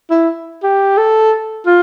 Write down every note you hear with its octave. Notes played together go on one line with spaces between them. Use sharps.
E4
G4
A4
F4